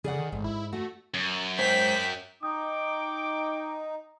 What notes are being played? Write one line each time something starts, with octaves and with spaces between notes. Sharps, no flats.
C#3 G#4 D5 F#5
D#3
A1 G#2
E4
A3 F#4
F#2
G#2 C5 G5 B6
D#4 G5 D6 D#6